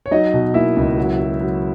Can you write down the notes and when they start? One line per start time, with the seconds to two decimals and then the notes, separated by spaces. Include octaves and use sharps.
0.06 C#5
0.11 F#3 D#4 D#5
0.34 B2
0.54 A#3 E4 E5
0.77 C#2
0.97 F#3
1.19 F#3
1.40 F#3